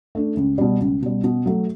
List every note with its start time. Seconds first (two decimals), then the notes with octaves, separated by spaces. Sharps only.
0.15 A3 D4
0.37 C#2
0.58 B2 G3
0.80 C#2
1.02 B2 G3
1.24 B2
1.46 F#3 A3